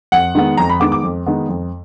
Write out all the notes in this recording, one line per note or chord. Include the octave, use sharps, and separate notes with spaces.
F2 F#5
D#3 G#3 B3
F2 A#5
B5
D#3 G#3 B3 D6
D6
F2
D#3 G#3 B3
F2